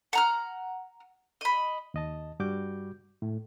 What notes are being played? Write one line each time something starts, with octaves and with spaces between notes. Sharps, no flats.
F#5 A#5 F6
D#5 B5
D#2 D#5 A5
G2 G3 F#4 D6 G6
A2